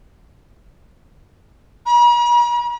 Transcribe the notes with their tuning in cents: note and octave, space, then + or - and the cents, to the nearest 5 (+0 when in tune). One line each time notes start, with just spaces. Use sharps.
A#5 +45